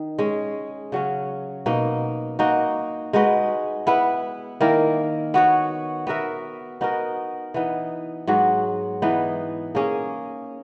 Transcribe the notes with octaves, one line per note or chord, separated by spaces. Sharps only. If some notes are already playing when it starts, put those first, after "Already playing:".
Already playing: D#3 D#4
G#3 C#4 G#4
C#3 F#3 C#4
B2 A#3 D#4
A#3 D#4 F#4
G#3 D#4 F#4 B4
B3 E4 B4
D#3 A#3 E4 A#4
B3 F#4 C#5
B3 F#4 A#4 E5
B3 D#4 F#4 A#4
E3 B3 D#4
G#2 F#3 B3 F#4
E3 B3 D#4
A#3 C#4 G#4